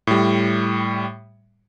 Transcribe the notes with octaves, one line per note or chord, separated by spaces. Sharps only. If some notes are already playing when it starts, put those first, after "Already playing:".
A2 G3